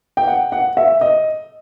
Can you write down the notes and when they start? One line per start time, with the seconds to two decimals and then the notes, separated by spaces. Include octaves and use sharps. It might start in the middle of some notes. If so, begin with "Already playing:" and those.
0.17 G5
0.27 F#5
0.52 F#5
0.77 E5
1.01 D#5